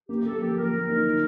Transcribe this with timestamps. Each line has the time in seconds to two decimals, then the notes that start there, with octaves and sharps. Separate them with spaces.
0.09 A#3 G4
0.25 A#3 A4
0.41 F3 G4
0.57 A#3 A#4
0.73 A#3
0.89 D#4
1.05 D#3